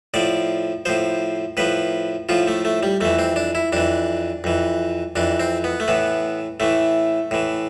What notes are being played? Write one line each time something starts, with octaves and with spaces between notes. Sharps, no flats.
A2 F3 D5
A2 F3 C5
A2 F3 B4
A2 F3 F4
A3
A3
G3
F2 E3 A3
C4
D4
E4
F2 E3 D4
F2 E3
F2 E3 D4
C4
B3
A3
A2 E3 B3
A2 E3 A3
A2 E3